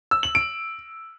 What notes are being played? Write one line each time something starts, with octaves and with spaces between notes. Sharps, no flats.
E6
F#7
D7